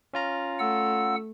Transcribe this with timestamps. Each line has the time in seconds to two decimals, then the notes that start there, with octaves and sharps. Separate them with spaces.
0.13 C#4 F4 A#5
0.59 A3 F#5 E6